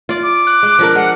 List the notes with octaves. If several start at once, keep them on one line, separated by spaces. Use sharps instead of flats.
F4 D5
D6
F#6
G#3
F3 D4 A#4
G#3 F#5